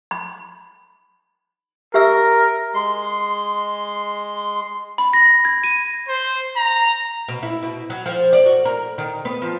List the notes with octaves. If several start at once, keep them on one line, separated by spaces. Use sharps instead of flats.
B5
G4 A#4 E5 E6
G#3 C6
B5
A#6
G#6
D#7
C5
A#5
B2
E4
B2
F#3
F3
D5
F#4
A#4
D#3
B3
F3